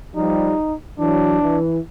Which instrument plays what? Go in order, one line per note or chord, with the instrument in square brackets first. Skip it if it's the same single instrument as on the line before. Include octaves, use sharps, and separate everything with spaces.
[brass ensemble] F3 G3 [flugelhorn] D#4
[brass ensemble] E3 F#3 [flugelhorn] D4
[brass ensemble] E3